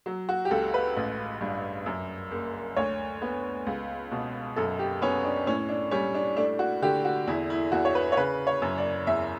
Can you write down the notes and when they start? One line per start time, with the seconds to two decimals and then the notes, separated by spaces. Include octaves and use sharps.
0.06 F#3
0.29 F#4
0.45 G4
0.51 C#2 A4
0.74 B4
0.96 A1
1.41 G2
1.86 F#2
2.31 F#1
2.76 D2 C#5
3.22 B3
3.67 C#2
4.12 B2
4.56 F#2 A4
4.79 G4
5.02 B3 C#4
5.24 D4
5.47 A2 C#4
5.69 D4
5.91 G3 C#4
6.15 D4
6.37 A3 D4
6.59 F#4
6.82 D3 G4
7.05 F#4
7.27 E2 E4
7.50 E4
7.72 E2 F#4
7.85 C#5
7.95 B4
8.12 C#5
8.17 C#3 B4
8.47 C#5
8.62 F#2
8.78 D5
9.07 E2 E5